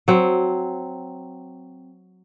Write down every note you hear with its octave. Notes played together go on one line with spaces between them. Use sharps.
F#3 C4